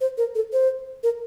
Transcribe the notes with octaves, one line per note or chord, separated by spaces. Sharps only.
C5
A#4
A4
C5
A#4